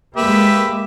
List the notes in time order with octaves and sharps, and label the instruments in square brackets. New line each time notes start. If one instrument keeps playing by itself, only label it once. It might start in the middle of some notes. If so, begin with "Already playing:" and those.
[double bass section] G#3 A#3 [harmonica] G4 B4 E5